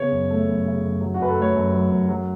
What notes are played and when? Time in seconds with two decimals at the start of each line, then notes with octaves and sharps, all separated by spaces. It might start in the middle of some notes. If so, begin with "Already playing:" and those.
Already playing: C#3 B3 C#5
0.11 F#2
0.30 A3
0.48 F#2
0.65 C#3
0.83 F#2
1.01 F#3
1.14 F#4
1.20 F#2 B4
1.29 A4
1.37 A3 C#5
1.55 F#2
1.73 F#3
1.90 F#2
2.09 F#3